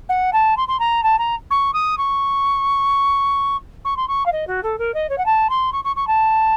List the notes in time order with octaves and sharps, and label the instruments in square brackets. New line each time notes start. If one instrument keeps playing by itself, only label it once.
[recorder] F#5
A5
C6
C6
A#5
A5
A#5
C#6
D#6
C#6
C#6
C6
C#6
F5
D#5
F#4
A4
A#4
D#5
C#5
F#5
A5
C6
C#6
C#6
C#6
A5